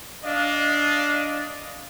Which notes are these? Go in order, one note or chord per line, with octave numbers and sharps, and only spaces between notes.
D4 D#5 F5